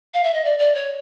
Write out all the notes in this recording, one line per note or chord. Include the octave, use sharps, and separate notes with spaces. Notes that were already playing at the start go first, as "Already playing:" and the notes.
F5
E5
D#5
D5
D5
C#5